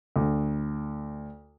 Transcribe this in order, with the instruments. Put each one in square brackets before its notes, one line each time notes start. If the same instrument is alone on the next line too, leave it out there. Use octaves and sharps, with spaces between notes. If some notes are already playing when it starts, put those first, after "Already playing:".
[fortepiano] D2